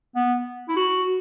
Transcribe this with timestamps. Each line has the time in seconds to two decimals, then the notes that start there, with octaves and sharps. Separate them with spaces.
0.15 B3
0.68 E4
0.76 F#4